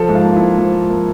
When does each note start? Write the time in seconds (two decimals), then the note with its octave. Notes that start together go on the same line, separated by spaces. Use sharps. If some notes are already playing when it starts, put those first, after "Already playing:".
Already playing: F3 A4
0.09 G#2
0.15 F4
0.25 A#3
0.36 E4
0.41 G#2
0.58 F3
0.74 G#2
0.90 A#3